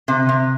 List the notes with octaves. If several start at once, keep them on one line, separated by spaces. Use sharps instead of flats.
C3
C3